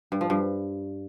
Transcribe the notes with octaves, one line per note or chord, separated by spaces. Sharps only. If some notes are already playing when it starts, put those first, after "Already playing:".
G2
F3
G2